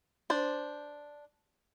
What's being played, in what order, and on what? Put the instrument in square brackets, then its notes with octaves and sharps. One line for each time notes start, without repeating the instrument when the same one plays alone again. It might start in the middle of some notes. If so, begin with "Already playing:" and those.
[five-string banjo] D4 C5